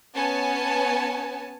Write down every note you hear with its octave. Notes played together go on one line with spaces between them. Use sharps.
B3 C#4 G#5 A5